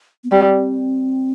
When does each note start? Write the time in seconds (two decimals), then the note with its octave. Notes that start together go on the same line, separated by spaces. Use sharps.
0.24 B3
0.31 G3 C4